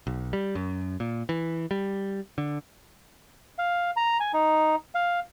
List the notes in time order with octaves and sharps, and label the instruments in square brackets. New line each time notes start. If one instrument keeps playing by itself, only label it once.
[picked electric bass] B1
G3
F#2
A#2
E3
G3
D3
[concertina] F5
A#5
G#5
D#4
F5